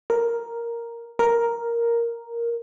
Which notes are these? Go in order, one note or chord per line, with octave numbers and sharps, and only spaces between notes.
A#4
A#4